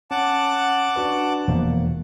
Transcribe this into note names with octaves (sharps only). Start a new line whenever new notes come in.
C#4 F#5 A5 D6
D4 F#4 B4
E1 B2 F3 A#3